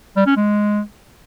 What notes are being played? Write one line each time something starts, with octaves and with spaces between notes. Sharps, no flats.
G3
C#4
G#3